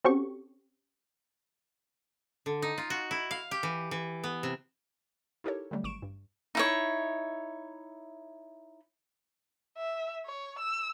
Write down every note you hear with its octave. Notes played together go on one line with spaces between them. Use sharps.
C4 C#4 F#4 G4 A4 C#6
D3
D#4
F4
F#4
E4
F5
G4
E3
E3
B3
C3
D#4 E4 G4 A4 A#4 C#5
D3 F#3 G3 A3
G#1 C#6 D7 E7
G2
D#4 E4 C#5
E5
C#5
E6